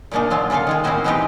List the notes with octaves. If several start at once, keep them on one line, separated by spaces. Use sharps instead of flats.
A#2 C#3 A#3 D4 D#4
D3 F#3 D4 F4
C#3 A#3 F4 A4 F5
D#3 G#3 G#4
A#3 C4 C#4 E4 F#4 C5
E3 G#3 B3 C4 D#4 G4